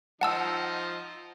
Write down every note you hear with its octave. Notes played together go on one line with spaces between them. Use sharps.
F3 D#4 F#5 A5 E6